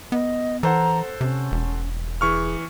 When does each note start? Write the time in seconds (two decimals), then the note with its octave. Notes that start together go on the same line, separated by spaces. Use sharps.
0.12 B3 D#5
0.63 E3 A4 C5 F#5 A#5
1.21 C3 C#4
1.52 E1
2.21 E3 G#4 C#6 F6